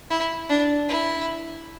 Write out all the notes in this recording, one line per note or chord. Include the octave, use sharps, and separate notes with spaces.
E4
D4
E4